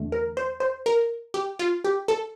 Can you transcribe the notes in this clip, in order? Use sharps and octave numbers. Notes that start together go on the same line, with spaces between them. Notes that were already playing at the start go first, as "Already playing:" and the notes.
Already playing: E2 D3 A3
A#4
C5
C5
A#4
G4
F4
G4
A4